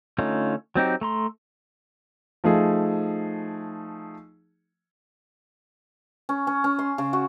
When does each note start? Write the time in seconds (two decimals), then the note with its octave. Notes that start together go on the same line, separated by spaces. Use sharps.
0.18 D3 A3 C#4 D#4 F4
0.75 F#3 C4 D#4 G4
1.01 A3 A#5 C6
2.44 F3 A3 D#4 G#4
6.29 C#4
6.47 C#4
6.64 C#4
6.79 C6
6.98 C#3
7.13 F#4